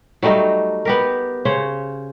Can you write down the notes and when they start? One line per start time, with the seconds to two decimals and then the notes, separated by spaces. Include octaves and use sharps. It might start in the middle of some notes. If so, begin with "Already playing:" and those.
0.23 F#3 G3 A3 D#4
0.85 B3 G4 A#4
1.45 C#3 C5 C#5